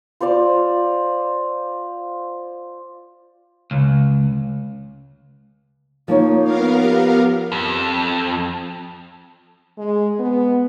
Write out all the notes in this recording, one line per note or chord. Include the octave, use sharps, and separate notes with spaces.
F4 C5 D5 F5
C#2
F3 A#3 D#4 C#5
B3 A#4 F5
G4
F2
G#3
B3